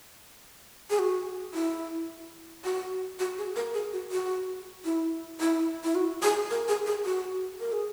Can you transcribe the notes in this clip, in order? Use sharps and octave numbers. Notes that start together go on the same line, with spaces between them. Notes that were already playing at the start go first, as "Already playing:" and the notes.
G#4
F#4
E4
F#4
F#4
G#4
A#4
G#4
F#4
F#4
E4
E4
E4
F#4
G#4
A#4
G#4
G#4
F#4
A#4
G#4